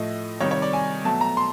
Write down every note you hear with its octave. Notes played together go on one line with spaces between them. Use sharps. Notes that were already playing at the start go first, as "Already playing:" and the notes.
Already playing: A2 F3 A3 D#5
C3 D#3 G3 C#5
C#5
D5
G#5
B2 F#3 A3 A5
A#5
C6